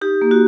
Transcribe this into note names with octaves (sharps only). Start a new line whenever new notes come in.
D#4 G4
A#3
F#4